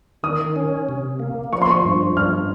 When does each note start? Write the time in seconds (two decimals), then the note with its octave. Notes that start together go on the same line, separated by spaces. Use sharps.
0.23 D#3 D#6
0.56 C#4
0.89 C3
1.20 A#3
1.52 F3 C#6
1.62 C6
1.71 C#6
1.85 G2
2.17 G2 F6